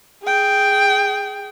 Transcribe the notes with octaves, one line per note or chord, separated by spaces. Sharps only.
G#4 G5